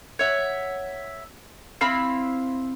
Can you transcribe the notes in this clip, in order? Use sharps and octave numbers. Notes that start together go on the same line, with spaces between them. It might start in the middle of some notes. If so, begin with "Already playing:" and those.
C#5 E5 F#5
C4 E4 F5 B5